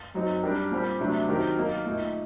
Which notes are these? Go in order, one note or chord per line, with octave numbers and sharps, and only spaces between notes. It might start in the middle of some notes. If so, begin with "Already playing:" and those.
F#2 F#3 C4 D#4
G3 D4 G4 A#4
A#2 G3 C4 G4
C3 F#3 A3 D4
D#3 F#3 C4 G4 A#4
F#3 A#3 D#4
A#2 A3 D#4